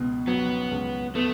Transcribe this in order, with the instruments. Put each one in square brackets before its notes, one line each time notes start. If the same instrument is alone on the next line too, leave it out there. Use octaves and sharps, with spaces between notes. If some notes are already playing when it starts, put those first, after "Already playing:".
Already playing: [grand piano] C#2 B2
[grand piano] F#3 [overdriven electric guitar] B3
[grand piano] C#2
[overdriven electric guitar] A3 [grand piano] B3